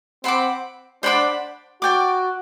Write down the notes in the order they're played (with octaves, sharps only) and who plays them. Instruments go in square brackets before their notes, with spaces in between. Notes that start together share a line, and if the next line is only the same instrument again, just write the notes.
[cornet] C4 [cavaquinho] C5 F#5 B5 D6
[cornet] D4 [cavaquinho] C5 F#5 B5 D6
[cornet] F#4 [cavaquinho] D5 G5 D6